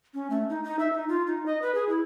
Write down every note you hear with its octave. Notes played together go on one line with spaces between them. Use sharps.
C#4
A3
D#4
D#4
E5
D#4
F4
D#4
D#5
B4
G#4
E4